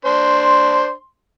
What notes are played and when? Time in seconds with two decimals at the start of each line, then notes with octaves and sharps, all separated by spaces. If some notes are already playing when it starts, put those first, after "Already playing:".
0.05 D4 C5 C6